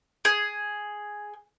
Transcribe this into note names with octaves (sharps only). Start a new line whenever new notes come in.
G#4